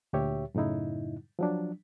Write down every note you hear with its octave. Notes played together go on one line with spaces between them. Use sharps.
D2 A#2 G4 C#5 E5
F#2 A2 C#3 D#4 E4
F3 F#3 D4